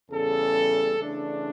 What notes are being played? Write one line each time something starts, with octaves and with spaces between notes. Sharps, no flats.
E2 C#3 G3 A4
C#3 E3 A3 D4